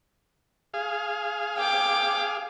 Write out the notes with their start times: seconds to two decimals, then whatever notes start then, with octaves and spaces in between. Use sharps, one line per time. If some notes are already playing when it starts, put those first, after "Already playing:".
0.74 G#4 F5
1.57 G5 D6